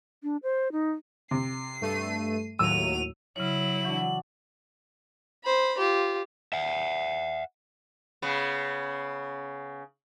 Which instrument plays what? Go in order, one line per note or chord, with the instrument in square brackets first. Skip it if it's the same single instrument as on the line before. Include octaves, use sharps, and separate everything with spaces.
[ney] D4
C5
D#4
[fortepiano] C3 [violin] C7
[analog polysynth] G2 A3 D#7
[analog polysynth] D#2 A2 F#3 [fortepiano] E6 [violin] D#7 F7
[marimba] C#3 C#5 [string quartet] F#3 E4 [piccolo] F#7
[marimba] E3 [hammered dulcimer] D4 F#4
[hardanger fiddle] C5 B5
F4 G4
[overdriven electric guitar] E5 F#5
[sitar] C#3 B3